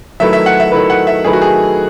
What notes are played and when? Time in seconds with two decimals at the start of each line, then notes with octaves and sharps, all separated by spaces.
0.20 D#3 F#3 A3 E4 B4 E5
0.33 E5
0.46 F#5
0.60 E5
0.71 D#3 F#3 A3 E4 B4
0.90 F#5
1.07 E5
1.24 D#3 F#3 A3 E4 G#4 B4
1.33 F#4
1.42 G#4